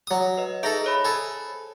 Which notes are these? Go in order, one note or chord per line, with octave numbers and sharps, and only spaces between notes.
F#3 D#6
B4 D#5
D#4 G#4 A4 E5 A#6
C5 C#5 B5
G#4 A4